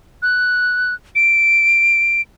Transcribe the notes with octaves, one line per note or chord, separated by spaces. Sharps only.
F#6
D7